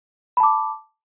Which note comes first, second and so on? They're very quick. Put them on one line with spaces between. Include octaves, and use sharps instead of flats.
B5 A5 D6